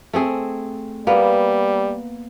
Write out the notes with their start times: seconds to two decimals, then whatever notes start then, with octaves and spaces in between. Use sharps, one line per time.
0.13 A3 C4 G#4
1.07 G3 A#3 B3